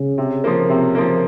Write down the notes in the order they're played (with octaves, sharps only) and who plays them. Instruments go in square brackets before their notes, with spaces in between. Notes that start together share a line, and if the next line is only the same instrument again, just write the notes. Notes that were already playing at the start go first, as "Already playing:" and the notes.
Already playing: [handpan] C#3
[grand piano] C3
F3 A#3
C3
F3 A#3